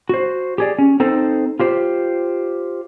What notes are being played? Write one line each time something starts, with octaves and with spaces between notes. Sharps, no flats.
F#4 C5
G4 G#4 D5
C#4
C4 D#4 A4 C5
F4 G4 C5